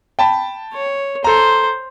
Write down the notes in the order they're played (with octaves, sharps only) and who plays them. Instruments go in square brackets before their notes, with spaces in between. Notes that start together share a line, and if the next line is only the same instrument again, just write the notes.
[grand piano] G5 A5 B5
[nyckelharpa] C#5
[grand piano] A4 A#5 [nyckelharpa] C5